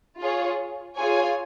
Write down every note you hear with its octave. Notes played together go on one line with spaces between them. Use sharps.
F4 G#4 C#5
F4 G#4 C#5 G#5